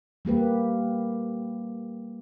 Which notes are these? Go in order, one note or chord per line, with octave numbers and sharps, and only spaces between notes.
G3 A#3 G4 B4